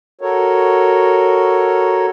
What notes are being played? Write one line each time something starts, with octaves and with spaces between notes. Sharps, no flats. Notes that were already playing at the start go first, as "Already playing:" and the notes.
F#4 A4 A#4 C#5